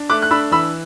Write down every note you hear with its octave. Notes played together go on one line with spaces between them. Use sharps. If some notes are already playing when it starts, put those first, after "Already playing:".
Already playing: D4
A3 D6 F#6
F#6
D4 B5 E6
E3 B5 E6